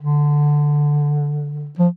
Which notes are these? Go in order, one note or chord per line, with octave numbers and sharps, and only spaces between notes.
D3
F3